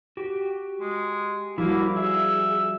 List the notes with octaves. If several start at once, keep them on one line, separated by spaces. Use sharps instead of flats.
F#4 G4
G#3
F3 G3 A#3 E4 F#4
G#4 E5